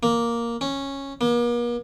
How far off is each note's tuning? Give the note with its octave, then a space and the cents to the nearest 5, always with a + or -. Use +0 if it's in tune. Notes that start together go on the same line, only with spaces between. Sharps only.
A#3 +5
C#4 -10
A#3 +45